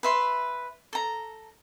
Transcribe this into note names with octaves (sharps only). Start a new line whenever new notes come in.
B4 E5 C6
A4 A#5